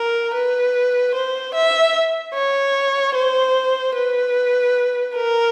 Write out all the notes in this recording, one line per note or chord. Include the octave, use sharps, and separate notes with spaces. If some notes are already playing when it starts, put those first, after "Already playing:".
Already playing: A#4
B4
C5
E5
C#5
C5
B4
A#4